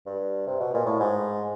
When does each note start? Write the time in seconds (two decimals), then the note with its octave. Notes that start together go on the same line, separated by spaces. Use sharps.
0.07 G2
0.47 C3
0.60 B2
0.74 A#2
0.86 A2
1.00 G#2